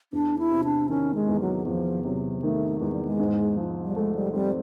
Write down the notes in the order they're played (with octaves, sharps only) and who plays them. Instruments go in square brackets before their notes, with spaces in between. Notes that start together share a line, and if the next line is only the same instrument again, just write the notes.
[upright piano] E2 [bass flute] D4
[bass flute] E4
[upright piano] C3
[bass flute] D4
[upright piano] D#3 [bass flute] C#4
[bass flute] G#3
[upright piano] E2
[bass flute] F#3
[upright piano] E2 [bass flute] F3
[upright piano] C3 [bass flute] F#3
[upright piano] D#3 [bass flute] A3
[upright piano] E2 [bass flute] G#3
[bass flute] G3
G#3
[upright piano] G#2
F3
[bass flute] G3
[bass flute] G#3 [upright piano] A3
[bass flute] G3
[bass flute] G3 [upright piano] C4